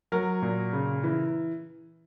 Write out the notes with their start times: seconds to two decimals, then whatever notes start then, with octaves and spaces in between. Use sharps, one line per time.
0.12 F#3 A#4
0.42 A#2
0.73 C#3
1.04 E3